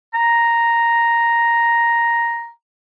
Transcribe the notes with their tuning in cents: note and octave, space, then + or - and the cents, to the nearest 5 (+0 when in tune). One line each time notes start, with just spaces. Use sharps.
A#5 +0